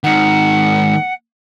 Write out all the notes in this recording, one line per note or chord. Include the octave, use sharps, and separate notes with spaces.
G#2 D#3 F#5